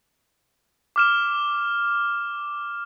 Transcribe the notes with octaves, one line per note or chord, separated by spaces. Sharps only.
D6 F6 E7